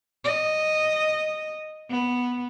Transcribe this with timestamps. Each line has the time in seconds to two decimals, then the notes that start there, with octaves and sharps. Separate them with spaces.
0.24 D#5
1.90 B3